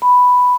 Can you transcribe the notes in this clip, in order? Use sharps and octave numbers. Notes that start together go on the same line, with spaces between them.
B5